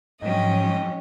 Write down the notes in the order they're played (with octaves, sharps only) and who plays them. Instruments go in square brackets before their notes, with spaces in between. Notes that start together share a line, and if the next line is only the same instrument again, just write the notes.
[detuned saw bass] G#2 [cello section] F3 F#3 C#4 [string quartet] D#5 G5